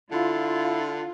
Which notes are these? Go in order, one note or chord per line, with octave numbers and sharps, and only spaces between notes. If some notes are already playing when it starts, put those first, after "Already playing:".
D3 E4 F4